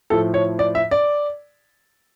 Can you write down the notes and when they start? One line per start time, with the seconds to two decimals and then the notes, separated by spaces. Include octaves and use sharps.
0.10 A2 F3 A4
0.34 C#5
0.59 D5
0.75 E5
0.91 D5